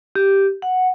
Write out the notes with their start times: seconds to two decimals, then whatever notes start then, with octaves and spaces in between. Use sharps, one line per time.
0.16 G4
0.62 F#5